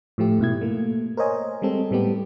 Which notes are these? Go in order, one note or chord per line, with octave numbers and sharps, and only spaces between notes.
A2 F3 A3 G4
G#2 B2 E4 G#6
A3 A#3
A#4 C5 C#5 D#5 G#5
G3 G#3 C4 A4
A2 G3 B3 G4